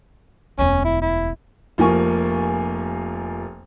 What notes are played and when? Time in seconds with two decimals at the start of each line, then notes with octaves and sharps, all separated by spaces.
0.58 E1 D2 C#4
0.84 E4
1.02 E4
1.78 F1 F3 A#3 G#5 C#6